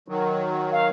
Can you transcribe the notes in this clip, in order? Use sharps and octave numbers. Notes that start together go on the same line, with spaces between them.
D#3 F#3
F5